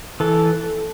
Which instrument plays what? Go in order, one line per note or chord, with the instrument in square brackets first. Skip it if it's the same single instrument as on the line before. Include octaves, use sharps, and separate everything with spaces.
[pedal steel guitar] E3 A4